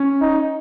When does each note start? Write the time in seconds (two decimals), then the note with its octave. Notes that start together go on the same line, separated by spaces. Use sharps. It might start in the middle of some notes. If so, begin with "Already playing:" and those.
Already playing: C#4
0.21 D#4